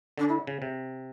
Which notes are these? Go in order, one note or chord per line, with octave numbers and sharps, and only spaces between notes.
D3 D4
E4
C#3
C3